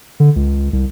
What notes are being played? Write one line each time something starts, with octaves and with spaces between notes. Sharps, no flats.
D3
C#2
C2